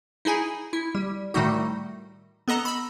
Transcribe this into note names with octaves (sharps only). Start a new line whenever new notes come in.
D#4 E4 G#4 G#5
E4
G3
A2 D#3 G3 A3 D#4 F#4
B3 A4 D#5 A#5
B5 E6